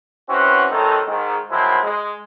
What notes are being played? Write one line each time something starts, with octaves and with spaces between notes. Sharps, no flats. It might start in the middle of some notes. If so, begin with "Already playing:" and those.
E3 C4 C#4 F#4
D#3 F#3 A3 C4 D#4 A4
G#2 D#3
D#3 F3 F#3 G#3 C4 E4
G#3